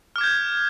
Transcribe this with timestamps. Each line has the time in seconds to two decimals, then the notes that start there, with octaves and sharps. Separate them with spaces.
0.16 F6
0.18 D6
0.21 G#6
0.24 G6